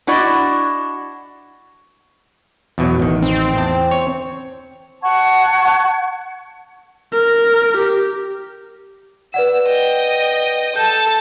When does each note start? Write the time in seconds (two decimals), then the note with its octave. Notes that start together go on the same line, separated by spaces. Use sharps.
0.07 D4 E4 F#4 D5 D#5
2.78 E2 B2 F#3
3.00 A1 D#3
3.22 C4
3.56 E2 A5
3.91 C#5
5.02 F#5 A5 C#6 G#6
7.13 A#4
7.77 G4
9.34 B4 D5 F#5 E6
9.67 D#5 G5
10.76 A4 A5 G6